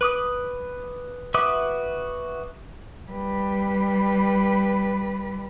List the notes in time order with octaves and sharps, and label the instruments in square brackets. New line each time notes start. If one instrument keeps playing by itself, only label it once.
[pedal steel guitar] B4 D6 D#6
F#4 B4 E5 D6 D#6
[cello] G3 B4